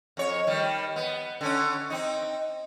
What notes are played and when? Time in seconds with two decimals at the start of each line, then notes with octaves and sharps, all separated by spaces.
0.17 F2 C#5
0.47 D#3 G3
0.96 B3
1.41 D3 C#4
1.90 C4 D#4